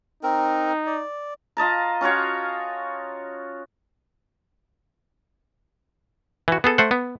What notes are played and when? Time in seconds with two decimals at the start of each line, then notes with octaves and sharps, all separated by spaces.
0.23 C4 D#4 A#4
0.87 D5
1.57 F4 D#5 A5 A#5
2.01 C#4 F4 F#4 C#5
6.48 E3 F#4
6.64 B3 G#4 A4
6.78 A3 C5 F#5
6.91 B3